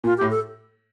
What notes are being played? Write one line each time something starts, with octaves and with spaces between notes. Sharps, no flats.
A#2 F4
A2 G4
A4